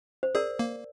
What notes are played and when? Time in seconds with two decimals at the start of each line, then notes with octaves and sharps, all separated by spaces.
0.23 C5
0.35 G#4 A#4 D5
0.59 A#3